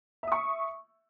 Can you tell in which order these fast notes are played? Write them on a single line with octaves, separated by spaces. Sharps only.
E5 D#6 C#6